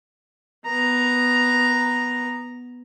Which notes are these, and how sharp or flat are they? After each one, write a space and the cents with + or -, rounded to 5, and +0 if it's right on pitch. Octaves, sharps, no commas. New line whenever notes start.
B3 +0 A#5 +0